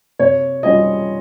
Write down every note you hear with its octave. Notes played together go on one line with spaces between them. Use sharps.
C3 C#5
G3 C#4 F4 D#5